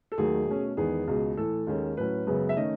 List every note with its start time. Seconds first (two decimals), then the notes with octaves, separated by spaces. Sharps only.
0.12 A4
0.18 D#2 D#3 F#3 A3 G#4
0.47 B2 A3 C#4
0.77 E2 D#3 G#3 B3 G#4
1.07 C#2 B2 G#3
1.37 A2 E3 A3 A4
1.67 D#2 D#3 G#3 C#4
1.97 A2 F#3 C#4 B4
2.27 F#2 C#3 G#3 B3
2.49 E5
2.57 D#3 A3 C#4 D#5